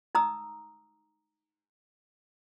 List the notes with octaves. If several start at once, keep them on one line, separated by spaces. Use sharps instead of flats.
D#4 A#5 D#6 E6